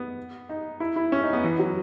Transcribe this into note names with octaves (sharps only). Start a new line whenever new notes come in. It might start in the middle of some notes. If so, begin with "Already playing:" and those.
Already playing: B3
D#4
E4
E4
C#4
D#4
B3
E3
F#3